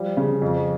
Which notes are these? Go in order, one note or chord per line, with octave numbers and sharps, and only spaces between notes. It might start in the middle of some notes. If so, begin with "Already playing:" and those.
Already playing: F3 G3
C#3
F2